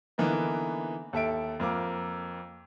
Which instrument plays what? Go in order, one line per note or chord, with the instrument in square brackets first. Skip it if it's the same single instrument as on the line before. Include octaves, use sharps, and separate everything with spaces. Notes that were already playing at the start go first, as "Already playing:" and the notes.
[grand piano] D3 E3 A#3 B3 D#4
D#2 A4 E5 D7
F2 A#3 F5 D6